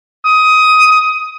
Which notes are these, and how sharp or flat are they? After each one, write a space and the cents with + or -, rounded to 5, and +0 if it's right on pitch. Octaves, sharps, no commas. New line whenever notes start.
D#6 +15